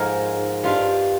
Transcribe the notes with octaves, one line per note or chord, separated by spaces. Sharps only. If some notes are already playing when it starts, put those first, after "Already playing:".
Already playing: G#2 F3 G#3 A#4
G2 G3 F4